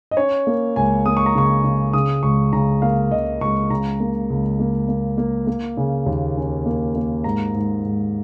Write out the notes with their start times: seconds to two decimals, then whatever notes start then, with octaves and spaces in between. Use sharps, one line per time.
0.11 D#5
0.17 C#4 C#5
0.47 A#3
0.76 C#2 G#5
1.06 A#3 D#6
1.17 C#6
1.26 A#5
1.35 C#3 C#6
1.64 C#3
1.93 C#3 D#6
2.23 C#2 C#6
2.53 C#3 A#5
2.82 A#3 F5
3.11 C#2 D#5
3.41 C#2 C#6
3.70 C#3 A#5
4.00 A#3
4.30 C#2
4.60 A#3
4.89 A#3
5.18 A#3
5.47 A#3
5.77 C#3
6.06 D#2
6.37 C#4
6.66 A#3
6.95 A#3
7.24 G#2 A#5
7.54 G#2
7.84 G#2